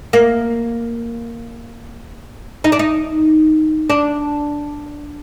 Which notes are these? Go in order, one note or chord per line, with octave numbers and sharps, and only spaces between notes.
A#3
D#4
D4
D#4
D4